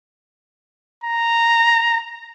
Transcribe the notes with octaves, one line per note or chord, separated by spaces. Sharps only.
A#5